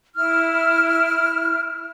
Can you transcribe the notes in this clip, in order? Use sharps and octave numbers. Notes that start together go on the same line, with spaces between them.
E4 F6